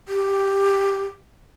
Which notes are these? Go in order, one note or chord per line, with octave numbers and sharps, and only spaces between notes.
G4